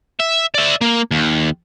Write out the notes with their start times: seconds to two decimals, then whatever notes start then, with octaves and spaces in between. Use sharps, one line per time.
0.20 E5
0.54 D5 E5
0.81 A#3
1.11 D#2